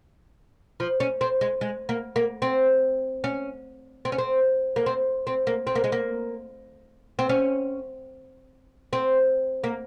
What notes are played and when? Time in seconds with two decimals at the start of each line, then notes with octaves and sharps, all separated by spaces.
0.80 F3
1.00 C#4
1.21 C4
1.41 G#3
1.61 G#3
1.89 A#3
2.16 A#3
2.42 C4
3.24 C#4
4.05 C4
4.12 C#4
4.18 C4
4.76 A#3
4.86 C4
5.27 C4
5.47 A#3
5.67 C4
5.75 A#3
5.84 G#3
5.92 A#3
7.19 C4
7.29 C#4
8.93 C4
9.64 A#3